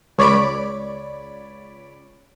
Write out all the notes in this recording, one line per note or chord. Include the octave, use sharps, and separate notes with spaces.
C#2 C#5 D5 B5 D7